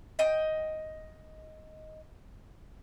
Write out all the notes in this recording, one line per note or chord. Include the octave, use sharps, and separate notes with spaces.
D#5 G5